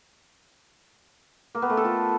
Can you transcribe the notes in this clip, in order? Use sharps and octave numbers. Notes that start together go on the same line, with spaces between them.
A#3
B3
A3
A4
F4